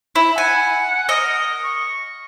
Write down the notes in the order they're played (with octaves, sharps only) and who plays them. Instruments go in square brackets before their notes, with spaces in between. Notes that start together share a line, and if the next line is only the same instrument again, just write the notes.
[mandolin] E4
[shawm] F#5 [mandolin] G#5
[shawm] A#4 [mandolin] D#5
[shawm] C#6